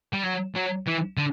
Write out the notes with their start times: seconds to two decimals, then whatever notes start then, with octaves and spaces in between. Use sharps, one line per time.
0.13 G3
0.23 F#3
0.55 F#3
0.87 E3
1.17 D3